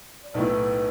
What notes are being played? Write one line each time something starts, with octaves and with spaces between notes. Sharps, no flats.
D5
B1 A2 A3 E4 B4